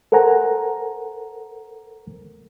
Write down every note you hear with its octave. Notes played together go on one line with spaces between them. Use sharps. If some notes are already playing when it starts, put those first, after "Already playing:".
A4 A#4 C5 F#5 G#5 A#5